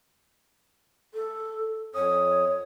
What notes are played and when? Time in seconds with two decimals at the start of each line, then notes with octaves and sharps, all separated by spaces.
1.14 A4
1.95 F2 C#5 D#6